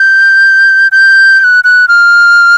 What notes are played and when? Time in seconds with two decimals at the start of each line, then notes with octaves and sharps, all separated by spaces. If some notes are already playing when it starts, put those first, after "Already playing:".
Already playing: G6
0.92 G6
1.40 G6
1.44 F#6
1.64 F#6
1.88 F6